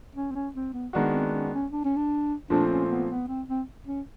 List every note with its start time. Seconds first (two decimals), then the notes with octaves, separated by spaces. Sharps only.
0.15 C#4
0.31 C4
0.35 C#4
0.55 C4
0.74 B3
0.93 D#3 G#3 B3 D4 F#4
1.13 C4
1.33 C#4
1.53 C#4
1.72 D4
1.84 C#4
1.96 D4
2.50 A#2 F3 A3 C4 D4
2.70 C#4
2.90 B3
3.10 B3
3.28 C4
3.49 C4
3.87 C#4